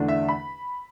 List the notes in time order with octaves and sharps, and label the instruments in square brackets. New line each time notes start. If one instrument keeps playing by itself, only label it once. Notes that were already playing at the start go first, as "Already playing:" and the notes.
Already playing: [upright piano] E2 D3 A3 D4
E5
B5